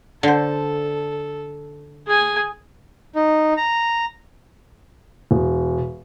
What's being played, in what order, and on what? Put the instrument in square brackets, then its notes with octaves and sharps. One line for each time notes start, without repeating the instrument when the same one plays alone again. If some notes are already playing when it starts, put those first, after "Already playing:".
[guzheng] D3 C5 [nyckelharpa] A4
[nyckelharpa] G#4 G#5
[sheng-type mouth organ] D#4
A#5
[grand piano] E1